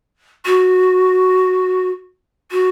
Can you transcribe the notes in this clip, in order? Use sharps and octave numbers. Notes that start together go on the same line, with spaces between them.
F#4
F#4